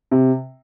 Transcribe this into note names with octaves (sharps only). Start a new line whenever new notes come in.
C3